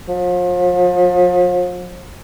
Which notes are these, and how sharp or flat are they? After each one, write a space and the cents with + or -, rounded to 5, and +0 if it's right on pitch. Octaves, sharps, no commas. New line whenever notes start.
F3 +40